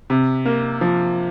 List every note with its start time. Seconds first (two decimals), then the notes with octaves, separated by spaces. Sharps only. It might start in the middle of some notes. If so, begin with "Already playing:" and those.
0.10 C3
0.45 A#3
0.81 F3